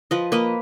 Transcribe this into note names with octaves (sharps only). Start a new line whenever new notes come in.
F3 B4 D#5
A#3 B4 D#5